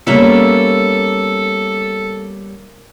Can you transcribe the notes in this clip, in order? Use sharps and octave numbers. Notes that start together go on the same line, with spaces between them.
G3 A#3 B3 C#4 A4 E5